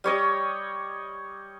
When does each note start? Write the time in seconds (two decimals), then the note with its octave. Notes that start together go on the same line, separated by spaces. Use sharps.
0.04 G3 C#5 D#5